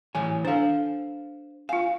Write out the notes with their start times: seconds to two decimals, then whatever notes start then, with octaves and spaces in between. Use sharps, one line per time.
0.15 E3 C#5 G#5
0.45 D4 A4 C5 F5
1.69 F4 F5 G#5